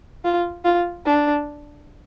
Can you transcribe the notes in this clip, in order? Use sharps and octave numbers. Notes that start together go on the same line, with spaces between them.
F4
F4
D4